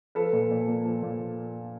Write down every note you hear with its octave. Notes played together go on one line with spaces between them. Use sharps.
F3 A4 B4
A#2
A#2
A#3
F3
A#2